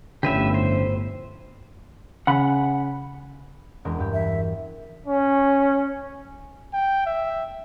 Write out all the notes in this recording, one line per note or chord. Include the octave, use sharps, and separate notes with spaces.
G1 A2 D3 F3 C#4 G4 B4 E5
C5
C#3 F#5 B5
E1 G#3 A#4
G2 G4
E5
C#4
G5
E5